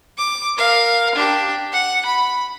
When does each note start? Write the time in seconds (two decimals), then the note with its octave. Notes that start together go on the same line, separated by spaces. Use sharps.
0.18 D6
0.57 A#4 F5
1.16 D4 G4
1.73 F#5
2.06 B5